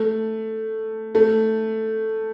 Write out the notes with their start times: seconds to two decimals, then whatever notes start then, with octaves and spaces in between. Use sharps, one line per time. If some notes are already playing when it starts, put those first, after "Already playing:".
Already playing: A3
1.15 A3